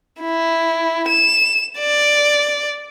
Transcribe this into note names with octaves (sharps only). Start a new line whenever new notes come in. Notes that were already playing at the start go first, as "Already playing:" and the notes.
E4
E7
D5